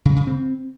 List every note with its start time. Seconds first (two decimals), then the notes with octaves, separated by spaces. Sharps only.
0.05 C#3
0.16 C#3
0.27 C4